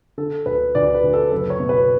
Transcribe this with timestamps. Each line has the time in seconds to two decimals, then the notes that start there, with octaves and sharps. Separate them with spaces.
0.18 D3 A4
0.46 D2 B4
0.75 D2 D5
0.94 B4
1.03 D2
1.13 A4
1.31 F#1 B4
1.50 C#5
1.60 B2
1.69 B4